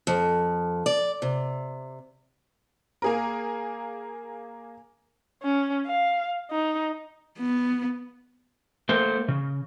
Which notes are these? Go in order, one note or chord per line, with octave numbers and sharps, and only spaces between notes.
F2
D5
C3
A#3 G#4 A#4
C#4
F5
D#4
B3
A3 A#3 C5
C#3